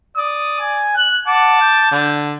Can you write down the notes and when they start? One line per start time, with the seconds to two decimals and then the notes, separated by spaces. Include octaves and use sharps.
0.17 D5 D#6
0.59 G#5
0.96 F#6
1.28 F#5 A5 D6
1.61 G6
1.92 D3